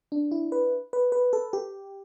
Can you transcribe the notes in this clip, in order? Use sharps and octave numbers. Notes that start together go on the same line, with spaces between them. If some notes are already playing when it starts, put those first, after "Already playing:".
D4
E4
B4
B4
B4
A4
G4